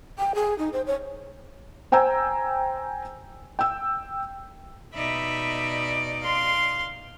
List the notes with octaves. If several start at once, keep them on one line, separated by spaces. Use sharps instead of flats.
G5
G#4
D#4
C5
C#5
C5 G5 G#5 A#5 E6
G5 E6
B2 D#4 D5 E5 B5
F5 C6